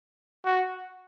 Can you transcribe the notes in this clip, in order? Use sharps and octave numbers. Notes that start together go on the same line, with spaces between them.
F#4